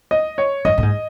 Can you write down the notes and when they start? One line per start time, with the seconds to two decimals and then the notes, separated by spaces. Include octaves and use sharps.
0.11 D#5
0.38 C#5
0.65 F#2 D#5
0.78 A2
0.83 G#2